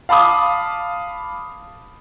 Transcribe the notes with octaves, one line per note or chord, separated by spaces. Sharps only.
F5 A5 B5 D6 D#6